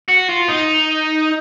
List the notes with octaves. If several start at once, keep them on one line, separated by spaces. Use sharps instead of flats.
F#4
F4
D#4